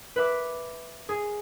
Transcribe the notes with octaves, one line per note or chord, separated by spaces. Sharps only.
B4 E5 D6
G#4